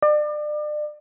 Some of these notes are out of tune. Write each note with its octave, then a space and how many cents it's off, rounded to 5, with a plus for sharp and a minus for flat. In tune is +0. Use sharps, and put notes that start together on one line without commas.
D5 +35